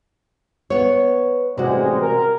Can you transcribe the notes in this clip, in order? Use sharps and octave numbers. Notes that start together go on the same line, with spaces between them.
B3 C#5
A1 C3 G3 G#3 F#4
A#4